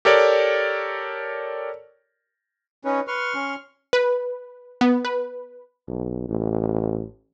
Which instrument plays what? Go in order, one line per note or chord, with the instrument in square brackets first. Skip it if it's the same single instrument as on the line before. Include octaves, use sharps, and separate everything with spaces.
[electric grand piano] G4 A4 A#4 C#5 D5
[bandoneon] C#4 [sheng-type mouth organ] D#4 B4 C#5
[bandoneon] B4 [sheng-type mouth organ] C6 C#6 F6
[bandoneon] C#4
[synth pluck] B4
B3
B4
[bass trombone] B1
A1